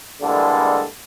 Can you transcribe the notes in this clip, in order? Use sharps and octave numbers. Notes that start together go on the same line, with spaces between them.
D3 E3 G3 G#3 A#3 A4